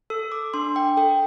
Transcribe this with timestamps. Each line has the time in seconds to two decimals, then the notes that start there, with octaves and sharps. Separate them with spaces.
0.10 A4 E6
0.32 D6
0.54 D4 C6
0.76 G5
0.97 A4 G5